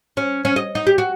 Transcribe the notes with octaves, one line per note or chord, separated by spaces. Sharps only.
C#4
C#4
D#5
D#4
G4
F#4